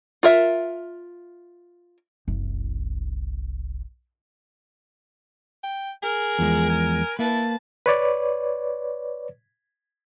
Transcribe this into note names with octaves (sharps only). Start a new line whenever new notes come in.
F4 A#4 E5
F#1 C2
G5
G#4 A#4
E2 F3 G#3
G#5
A#3 E4 B4 A5
B4 C#5 D5